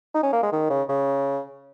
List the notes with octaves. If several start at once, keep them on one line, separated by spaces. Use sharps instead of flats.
D#4
C#4
A#3
G#3
D#3
C#3
C#3